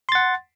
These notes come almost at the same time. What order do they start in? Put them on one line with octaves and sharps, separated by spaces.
C6 A6 F#5